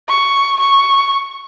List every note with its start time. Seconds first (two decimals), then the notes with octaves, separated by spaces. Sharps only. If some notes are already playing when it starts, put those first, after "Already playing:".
0.09 C#6
0.60 C#6